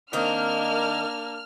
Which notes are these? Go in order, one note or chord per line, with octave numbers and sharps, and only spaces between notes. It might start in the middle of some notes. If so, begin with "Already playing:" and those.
D#3 A#3 C4 D4 D#4 F6